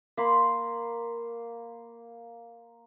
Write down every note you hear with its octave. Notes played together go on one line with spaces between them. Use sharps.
A#3 B5 C6